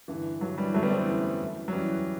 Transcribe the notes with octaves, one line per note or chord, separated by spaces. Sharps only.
G2 D3 E3
G2 D3 F#3
E3 G3
F#2 D3 F#3 A3
G3 B3
A3 C4
E3
F#2 D3
F#2 E3
F#3
F#2 E3 G3